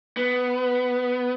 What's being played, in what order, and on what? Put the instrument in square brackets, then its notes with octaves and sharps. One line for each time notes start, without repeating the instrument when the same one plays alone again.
[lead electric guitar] B3